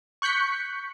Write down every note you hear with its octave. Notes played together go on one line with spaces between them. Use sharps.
C#6 F#6 G6 B6 C#7